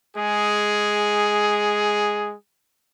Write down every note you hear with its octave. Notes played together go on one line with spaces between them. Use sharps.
G#3 G#4